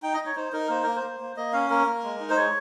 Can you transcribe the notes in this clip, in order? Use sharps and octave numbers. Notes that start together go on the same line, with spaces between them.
D#4 G5
D#5
D#4
C#5
D#4 C5
D#4 A#4
A#3 C5
A#3 A#4
C5
A#3
A#3
A#3 D#5
C#4 F5
A#3 A#4
A#3
G#3
D#4
C5
G#3 C#5